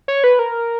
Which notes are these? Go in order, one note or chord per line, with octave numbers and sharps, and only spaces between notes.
C#5
B4
A#4